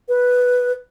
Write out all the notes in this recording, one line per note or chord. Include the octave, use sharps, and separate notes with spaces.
B4